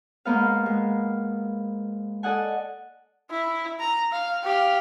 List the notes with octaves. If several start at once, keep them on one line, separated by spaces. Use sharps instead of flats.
G#2 A#3 B3 F5
G#3
A4 D5 D#5 F#5 G#5
E4
A#5
F5
G4 F5